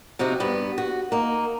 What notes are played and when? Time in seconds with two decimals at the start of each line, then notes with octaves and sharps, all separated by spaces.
0.19 C3 F3 D#4 F#4
0.40 G2 B3
0.78 F#4
1.12 A#3 D#4